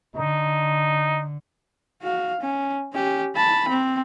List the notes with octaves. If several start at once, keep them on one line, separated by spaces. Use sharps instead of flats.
D3 D#4
F#4 F5
C#4
C#4 G4
A5 B5
C4